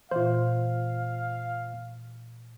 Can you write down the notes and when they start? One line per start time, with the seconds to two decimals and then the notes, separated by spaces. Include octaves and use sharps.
0.11 A#2 E3 F4 C5 F5